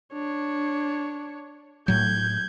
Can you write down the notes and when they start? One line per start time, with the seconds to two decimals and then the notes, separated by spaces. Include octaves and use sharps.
0.14 D4 C#5
1.88 A2 F#3 G6 G#6